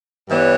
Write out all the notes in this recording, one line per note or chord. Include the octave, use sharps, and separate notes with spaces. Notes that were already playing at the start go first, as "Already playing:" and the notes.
G2 E3 G3 B3 C#5